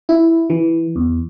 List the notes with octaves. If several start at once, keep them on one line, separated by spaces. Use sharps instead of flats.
E4
E3
E2